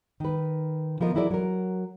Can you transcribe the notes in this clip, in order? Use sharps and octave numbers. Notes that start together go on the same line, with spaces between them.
D#3 B4
E3 F3 B3 A#4 D#5
E3 F#3 E4 G#4 A#4 D5
F#3 A#4